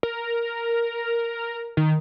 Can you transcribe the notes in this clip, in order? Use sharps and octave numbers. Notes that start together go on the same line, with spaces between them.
A#4
D#3